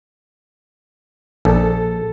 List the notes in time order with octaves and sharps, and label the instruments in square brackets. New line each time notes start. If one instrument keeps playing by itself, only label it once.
[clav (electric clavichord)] A#1 [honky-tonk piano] A4